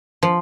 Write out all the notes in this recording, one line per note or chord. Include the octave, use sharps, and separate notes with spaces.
F3